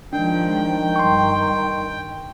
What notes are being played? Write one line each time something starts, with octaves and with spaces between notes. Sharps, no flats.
D#3 F3 G#3 D4 G5
G2 C6 C#6